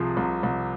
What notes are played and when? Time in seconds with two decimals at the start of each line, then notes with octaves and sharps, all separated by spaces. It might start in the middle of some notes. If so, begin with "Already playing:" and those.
Already playing: C2 C3 F3 G#4
0.17 C2
0.43 C2